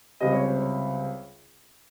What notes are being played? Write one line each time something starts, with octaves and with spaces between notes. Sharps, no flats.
C#2 C3 G3 C4 D#5
C#5
C5
C#5